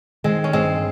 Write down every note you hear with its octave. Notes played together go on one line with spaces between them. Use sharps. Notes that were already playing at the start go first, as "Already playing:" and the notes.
D#3 G#3 C4
C#4
G2 G#3 C4